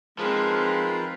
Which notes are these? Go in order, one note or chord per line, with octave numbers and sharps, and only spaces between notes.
F3 G#3 C4 D#4 A#4 B4